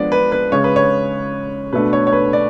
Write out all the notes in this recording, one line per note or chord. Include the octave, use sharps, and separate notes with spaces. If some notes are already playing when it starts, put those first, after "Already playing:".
Already playing: F3 G#3 B3 D4 D5
B4
B4
C#3 G#3 C#4 C#5
B4
C#5
B2 A3 D4 B4
C#5
C#5
B4
D5